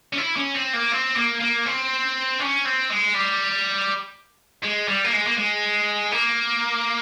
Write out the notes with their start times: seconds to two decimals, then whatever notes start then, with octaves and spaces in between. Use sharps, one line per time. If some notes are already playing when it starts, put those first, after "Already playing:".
0.13 C#4
0.18 E4
0.36 C#4
0.54 C4
0.73 A#3
0.92 C4
1.17 A#3
1.41 A#3
1.66 C4
2.40 C#4
2.65 C4
2.90 G#3
3.14 G3
4.63 G#3
4.88 G3
5.04 A#3
5.13 G#3
5.27 A#3
5.37 G#3
6.12 A#3